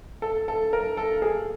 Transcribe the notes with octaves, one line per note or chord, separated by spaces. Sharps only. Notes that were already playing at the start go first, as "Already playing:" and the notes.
A4
A4
A#4
A4
G#4